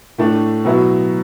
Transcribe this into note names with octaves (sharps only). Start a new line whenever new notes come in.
A2 A3 D4
B2 F#3 B3 E4